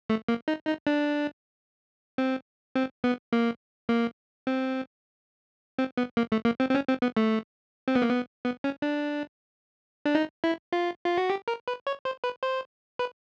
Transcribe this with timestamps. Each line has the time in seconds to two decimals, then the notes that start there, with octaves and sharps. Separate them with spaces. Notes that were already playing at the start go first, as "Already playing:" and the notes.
0.10 A3
0.28 A#3
0.48 D#4
0.67 D#4
0.87 D4
2.18 C4
2.76 C4
3.04 B3
3.33 A#3
3.89 A#3
4.47 C4
5.79 C4
5.97 B3
6.17 A#3
6.32 A3
6.45 A#3
6.60 C4
6.70 C4
6.75 C#4
6.88 C4
7.02 B3
7.17 A3
7.88 C4
7.95 B3
8.02 A#3
8.10 B3
8.45 B3
8.64 C#4
8.82 D4
10.06 D4
10.15 D#4
10.44 E4
10.73 F4
11.05 F4
11.18 F#4
11.30 G4
11.48 A#4
11.68 B4
11.87 C#5
12.05 C5
12.24 B4
12.43 C5
12.99 B4